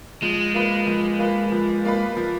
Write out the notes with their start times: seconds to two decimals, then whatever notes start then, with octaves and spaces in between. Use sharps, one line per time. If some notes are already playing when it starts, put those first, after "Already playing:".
0.22 F3 G#3
0.54 A#3 F4 B4
0.87 F3
1.19 A#3 F4 B4
1.52 F3
1.85 A#3 F4 B4
2.17 F3